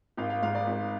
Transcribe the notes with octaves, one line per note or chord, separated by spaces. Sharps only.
G#1 F5
F5
G#2 F5
D5
G#1